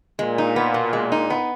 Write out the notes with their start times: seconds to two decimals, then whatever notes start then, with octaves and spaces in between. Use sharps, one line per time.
0.19 A#2 G#3
0.38 D#4
0.56 B3
0.74 B2
0.93 G#3
1.12 D#4
1.30 B3